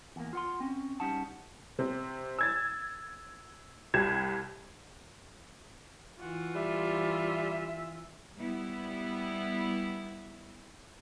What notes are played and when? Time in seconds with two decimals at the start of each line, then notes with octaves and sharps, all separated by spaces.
0.16 E2 A#3
0.33 F4 F#5 C6
0.60 C4 C#4
1.00 G3 C#4 D#4 F#5 A5
1.79 C3
2.39 E6 G#6 A6
3.94 C2 G4 G#6 E7
6.20 E3 F4 F#4
6.55 G3 E5
8.37 G3 B3 E4